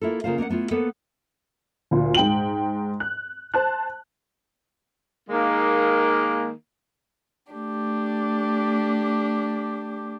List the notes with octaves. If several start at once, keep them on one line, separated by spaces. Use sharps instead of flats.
A#3 E4 F4 A4
C#3 A#3 F4 C5 F5
A#3 B3 D5 F#5
A3 B3 E4 F4
A#3 B3 A4 B4 C5
D2 A#2
G#2 G5 F#7
F#6
C5 A5 F#6
D#3 G#3 A#3
A3 D4 G4